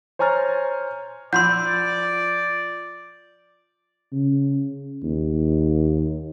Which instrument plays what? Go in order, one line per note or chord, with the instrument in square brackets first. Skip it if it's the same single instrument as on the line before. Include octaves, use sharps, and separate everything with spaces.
[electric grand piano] C5 C#5 G#5 A#5 F6 A6
[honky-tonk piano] F3 E6 [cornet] D5 [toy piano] F#5 B5 C6 [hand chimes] G6
[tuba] C#3
D#2